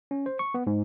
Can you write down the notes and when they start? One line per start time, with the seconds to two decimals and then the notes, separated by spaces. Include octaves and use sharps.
0.11 C#4
0.26 C5
0.39 C#6
0.54 B3
0.67 G#2